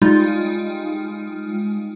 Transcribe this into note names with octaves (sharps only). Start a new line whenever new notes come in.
G3 G#3 D#4 F4